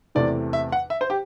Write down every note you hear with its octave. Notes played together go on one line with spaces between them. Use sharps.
E2 C3 E3 A3 D5
E5
F#5
E5
C5
G4